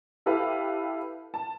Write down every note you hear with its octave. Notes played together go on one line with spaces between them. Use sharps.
E4 G4 A4 B4 F5
A5